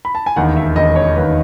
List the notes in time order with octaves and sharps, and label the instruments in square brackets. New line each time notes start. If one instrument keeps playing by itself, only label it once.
[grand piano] B5
A5
G#5
E1 D#2 D#3 F#5
E5
E1 D#2 D#3 D#5
C#5
E1 D#2 D#3 B4